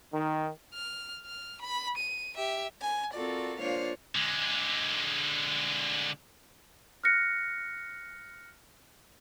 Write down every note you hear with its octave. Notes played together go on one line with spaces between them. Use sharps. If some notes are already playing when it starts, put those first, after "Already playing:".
D#3
F6
F6
B5
D#7
G4 E5
G#5
C4 F4 F#4 A4 A#4 D5
A#3 D4 F4 C5 C#5 F5
D3 G#3
F6 F#6 A#6 C#7